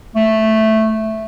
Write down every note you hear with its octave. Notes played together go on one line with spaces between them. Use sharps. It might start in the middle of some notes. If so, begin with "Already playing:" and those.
A3